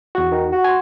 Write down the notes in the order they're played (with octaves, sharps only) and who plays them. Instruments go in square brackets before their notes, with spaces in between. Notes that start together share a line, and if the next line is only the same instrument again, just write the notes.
[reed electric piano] E2 F#4
[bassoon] D#3
F#4
[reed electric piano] G#5 C6